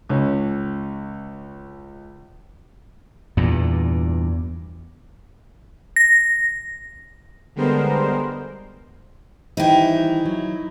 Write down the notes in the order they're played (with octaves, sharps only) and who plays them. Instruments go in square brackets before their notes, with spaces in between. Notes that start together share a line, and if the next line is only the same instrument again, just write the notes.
[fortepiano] C#2 C#4
[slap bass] E2 G2 A#2
[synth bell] A#6
[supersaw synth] D3 G3 G#3 B3 A#4 C5
[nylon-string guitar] D#3 E3 G3 [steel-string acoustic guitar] D#4 E4 [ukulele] C5 G5
[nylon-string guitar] F#3